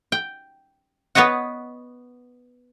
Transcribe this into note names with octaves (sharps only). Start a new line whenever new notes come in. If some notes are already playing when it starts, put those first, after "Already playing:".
G5
B3 B4 C#5 D#5 F#5